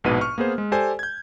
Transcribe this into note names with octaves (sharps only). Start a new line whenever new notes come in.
A#1 G#2 B2 B4 D#7
C#6 F6
A#3 B3 G#4 C5
G#3
G4 A4 C5 D5 G#5
G6 G#6